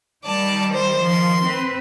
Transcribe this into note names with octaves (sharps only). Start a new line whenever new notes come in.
D#3 G3 D5 A5
C5
D#3 F3 C6
C4 B4